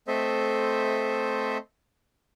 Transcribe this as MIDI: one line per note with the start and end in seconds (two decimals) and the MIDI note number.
0.08 1.57 57
0.08 1.57 60
0.08 1.57 69
0.08 1.57 72
0.08 1.57 75
0.08 1.57 76